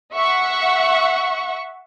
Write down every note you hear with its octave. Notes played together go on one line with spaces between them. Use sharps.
E5 F#5 C#6